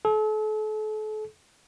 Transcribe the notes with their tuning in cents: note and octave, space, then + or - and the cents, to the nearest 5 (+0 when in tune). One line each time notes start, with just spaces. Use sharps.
A4 -40